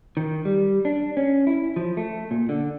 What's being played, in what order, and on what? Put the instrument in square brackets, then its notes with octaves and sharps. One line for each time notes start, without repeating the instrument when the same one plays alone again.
[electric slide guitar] D#3
G3
D4
C#4
E4
F3
A3
A#2
D3